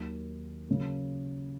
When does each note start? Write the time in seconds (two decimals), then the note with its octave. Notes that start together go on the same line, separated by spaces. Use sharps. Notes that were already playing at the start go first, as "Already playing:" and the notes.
Already playing: D#2 D#3 F#3
0.68 C#3 F#3 A#3